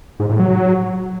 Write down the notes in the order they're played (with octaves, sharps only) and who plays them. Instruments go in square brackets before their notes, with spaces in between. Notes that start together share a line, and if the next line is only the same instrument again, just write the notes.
[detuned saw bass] G#2
A2
F#3